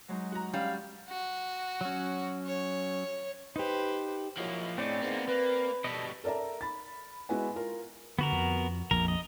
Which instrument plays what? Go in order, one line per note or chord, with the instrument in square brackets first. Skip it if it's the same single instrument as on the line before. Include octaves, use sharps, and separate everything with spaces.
[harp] F#3 G#3 D#4
[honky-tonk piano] F#4 A#5
[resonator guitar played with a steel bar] G3 [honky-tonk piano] C#4 [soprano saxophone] F5
[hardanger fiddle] F#4
[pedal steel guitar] F#3 C#4
[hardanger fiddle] C#5
[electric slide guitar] D#4 G4 [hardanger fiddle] B4 C5
[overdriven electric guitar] F3 A#3 [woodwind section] F#3 G#3 E4
[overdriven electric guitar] A2 [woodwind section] C#3 G#3 D4 [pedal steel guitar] C4 D5
[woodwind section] G#2 [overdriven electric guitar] A#3 B3
[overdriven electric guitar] A#3 [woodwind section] B4
[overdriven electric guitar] B2 G3 [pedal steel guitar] A4 D#5
[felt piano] A4 A#4 D5 E5 A#5
B5 A6
G#3 B3 E4 F#4 B4 G#5
F4 A#4
[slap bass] D3 [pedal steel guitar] B3 F#4 A#4
[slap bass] F2
[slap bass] A#1 F2 [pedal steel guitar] A#4
[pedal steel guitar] D#5